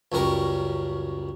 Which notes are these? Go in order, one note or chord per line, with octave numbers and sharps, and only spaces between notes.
C#2 F#2 G3 A#4 C#6